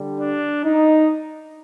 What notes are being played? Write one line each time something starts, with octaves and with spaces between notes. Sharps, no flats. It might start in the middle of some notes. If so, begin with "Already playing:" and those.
Already playing: D3 G3
D4
D#4